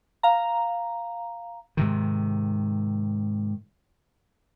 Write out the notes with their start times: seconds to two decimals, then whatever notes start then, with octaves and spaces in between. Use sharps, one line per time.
0.23 F5 A#5
1.77 G#2 C3 D#3